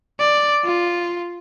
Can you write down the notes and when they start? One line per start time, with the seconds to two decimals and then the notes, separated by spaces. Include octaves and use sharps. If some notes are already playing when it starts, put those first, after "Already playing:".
0.20 D5
0.64 F4